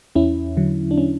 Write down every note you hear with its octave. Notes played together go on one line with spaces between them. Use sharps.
E2 C#4 E4
D3 F#3
D4
C#4